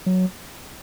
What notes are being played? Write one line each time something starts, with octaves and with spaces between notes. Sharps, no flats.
F#3